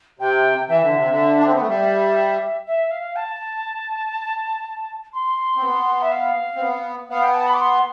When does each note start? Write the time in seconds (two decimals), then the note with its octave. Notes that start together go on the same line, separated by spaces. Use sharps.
0.19 C3 G5
0.69 E3 E5
0.82 D3
0.96 C3
1.09 D3
1.38 D4
1.46 C4
1.54 B3
1.60 A3
1.68 G3 E5
2.67 E5
2.91 F5
3.16 A5
5.13 C6
5.57 C4
5.62 B3
6.01 E5
6.11 F5
6.56 C4
6.61 B3
7.10 B3 F5
7.22 G5
7.34 A5
7.47 B5
7.54 D6
7.59 C6